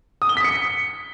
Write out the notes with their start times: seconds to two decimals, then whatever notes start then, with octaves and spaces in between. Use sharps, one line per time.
0.22 D#6
0.29 G7
0.37 B6
0.44 C#7